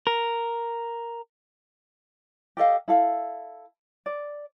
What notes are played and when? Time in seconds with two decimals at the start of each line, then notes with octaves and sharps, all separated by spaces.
0.07 A#4
2.57 G4 A4 D#5 F5
2.88 E4 A4 F5
4.06 D5